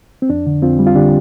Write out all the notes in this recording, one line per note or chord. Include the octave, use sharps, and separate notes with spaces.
C4
F2 D4
D3
F2 C4 F4
G3
F4
D3 D4 G4